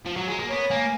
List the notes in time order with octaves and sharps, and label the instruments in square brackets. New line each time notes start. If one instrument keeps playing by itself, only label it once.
[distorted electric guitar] F3
F#3
G#3
A#3
[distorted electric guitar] B3 [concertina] C#5
[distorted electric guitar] A#3 [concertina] G#5